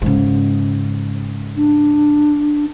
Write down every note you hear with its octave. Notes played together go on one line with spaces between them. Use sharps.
G#2 C#3
D4